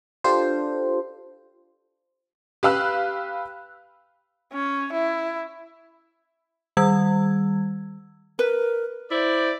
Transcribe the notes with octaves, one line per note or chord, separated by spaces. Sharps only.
D4 F4 G4 A4 C5
G4 B4 F5 E6 F#6
C#4
E4
D#3 G3 E6 G#6
A#4 B4
E4 C5 D5